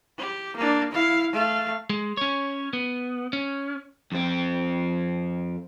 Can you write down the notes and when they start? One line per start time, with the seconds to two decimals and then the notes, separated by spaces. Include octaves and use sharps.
0.18 G4
0.56 A#3 D4
0.91 E4 F5
1.33 A3 F5
1.90 G#3
2.17 C#4 C#5
2.73 B3
3.33 C#4
4.12 F2 C4